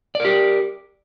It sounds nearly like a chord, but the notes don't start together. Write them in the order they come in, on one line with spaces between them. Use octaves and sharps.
D5 A#4 G4